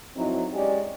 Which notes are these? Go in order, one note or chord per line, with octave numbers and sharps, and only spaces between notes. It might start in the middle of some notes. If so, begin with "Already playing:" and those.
F2 F#3 C4 D#4 E4
G#3 C#4 G4 D5